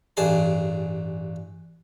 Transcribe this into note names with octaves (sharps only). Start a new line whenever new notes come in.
A1 G2 G#4 A5